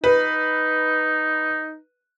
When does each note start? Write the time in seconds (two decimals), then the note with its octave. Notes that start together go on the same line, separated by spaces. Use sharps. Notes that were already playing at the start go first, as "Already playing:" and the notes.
0.04 D#4 B4